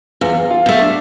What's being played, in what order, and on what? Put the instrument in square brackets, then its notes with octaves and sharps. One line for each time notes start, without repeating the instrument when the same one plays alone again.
[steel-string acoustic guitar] E2 [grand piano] F4
[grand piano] F4
[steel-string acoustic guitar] B2 A3
[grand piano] D4